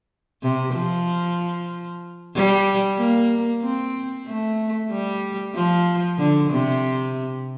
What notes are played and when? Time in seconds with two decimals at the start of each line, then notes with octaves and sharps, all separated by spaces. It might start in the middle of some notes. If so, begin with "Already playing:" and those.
0.42 C3
0.73 F3
2.35 G3
2.98 A#3
3.62 C4
4.27 A3
4.91 G3
5.55 F3
6.18 D3
6.51 C3